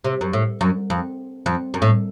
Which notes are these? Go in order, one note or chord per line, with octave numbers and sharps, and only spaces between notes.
C3
F#2
A2
F#2
F2
F2
F#2
A2